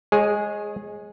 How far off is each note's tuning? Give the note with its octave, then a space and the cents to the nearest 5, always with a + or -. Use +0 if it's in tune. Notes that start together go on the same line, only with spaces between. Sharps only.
G#3 +0 G#4 +0 C#5 -30